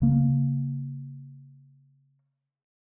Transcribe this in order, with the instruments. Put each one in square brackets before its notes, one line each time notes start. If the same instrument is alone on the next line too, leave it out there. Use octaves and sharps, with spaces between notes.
[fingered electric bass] C#3 A#3